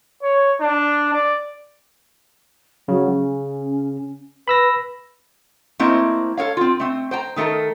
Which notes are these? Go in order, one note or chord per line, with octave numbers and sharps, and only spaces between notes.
C#5
D4
D5
C#3 F#3
C#4
B4 B5 E6 A#6
A3 A#3 C4 E4 C5 D#5
A4 A#4 C#5 F5
C4 F4
A3 C4
C5 G5 A5 A#5
D#3 A3 A4 A#4